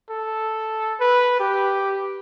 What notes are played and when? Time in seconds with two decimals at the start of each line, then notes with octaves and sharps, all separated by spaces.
0.10 A4
1.00 B4
1.40 G4